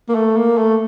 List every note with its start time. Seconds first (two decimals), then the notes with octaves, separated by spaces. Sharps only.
0.09 A#3
0.15 A3
0.37 A#3
0.58 A3